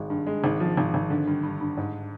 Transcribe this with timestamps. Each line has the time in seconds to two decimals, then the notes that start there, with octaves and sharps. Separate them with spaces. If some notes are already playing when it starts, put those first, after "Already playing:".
Already playing: G#1 D#3 G#3
0.10 G2
0.26 G#3
0.44 G#1
0.60 F3
0.77 G#1
0.94 G#1
1.10 D3
1.27 G2
1.43 G2
1.61 G2
1.77 G#2